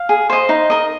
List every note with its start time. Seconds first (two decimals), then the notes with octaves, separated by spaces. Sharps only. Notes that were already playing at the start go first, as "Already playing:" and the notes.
Already playing: F5
0.09 G#4
0.30 C5 D#5
0.49 D#4
0.70 A#4 D#5